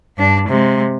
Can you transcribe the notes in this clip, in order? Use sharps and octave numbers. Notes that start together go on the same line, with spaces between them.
G2 D4
C3 G#3